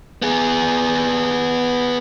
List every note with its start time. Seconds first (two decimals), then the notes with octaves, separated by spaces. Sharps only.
0.22 B3 G#4